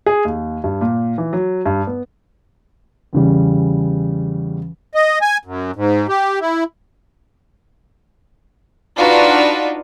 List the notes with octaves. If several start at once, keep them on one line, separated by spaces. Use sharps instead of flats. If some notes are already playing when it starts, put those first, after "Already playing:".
G#4
D#2
G2
A#2
E3
F#3
G2
B3
E2 C#3 G3
D#5
G#5
F#2
G#2
G4
E4
D4 D#4 F4 F#4 B4